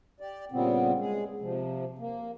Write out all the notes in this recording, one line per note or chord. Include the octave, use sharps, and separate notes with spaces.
G4 D5
A#2 C#3 G3 B3 C4
G#3 G#4
C3 F3
A#3